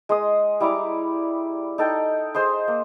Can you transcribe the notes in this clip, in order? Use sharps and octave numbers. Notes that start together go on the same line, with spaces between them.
G#3 C6 D#6
G3 E4 A#5 D6
D#4 A4 G5
G#4 C5 D#5 C6
A#3